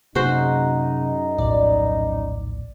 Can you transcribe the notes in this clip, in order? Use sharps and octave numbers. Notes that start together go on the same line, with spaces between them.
F#2 C3 A#3 D#4 F#4 G#4 C5
A#1 D#2 A2 D5